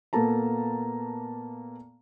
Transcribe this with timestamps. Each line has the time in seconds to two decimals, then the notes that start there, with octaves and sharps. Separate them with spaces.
0.13 A#2 A#3 B3 A4 A5 A#5